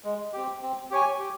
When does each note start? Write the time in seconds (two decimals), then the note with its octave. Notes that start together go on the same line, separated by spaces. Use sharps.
0.04 G#3
0.33 C4 G4
0.62 C4
0.91 G4 C#5 G#5
1.19 G4